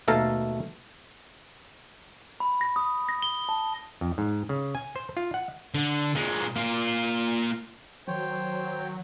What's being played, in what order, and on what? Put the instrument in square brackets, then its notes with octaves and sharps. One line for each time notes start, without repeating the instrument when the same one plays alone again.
[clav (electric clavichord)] D#2 B2 A3 A4 F5 A#5
[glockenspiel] B5
A#6
D#6
A#6
G7
A5
[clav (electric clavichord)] F2
G#2
C#3
G#5
C5
F4
F#5
[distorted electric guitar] D3
A#2 G#3
A#3 F4
[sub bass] D#3 [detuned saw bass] F#3 [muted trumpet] C5 [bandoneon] C#5 G5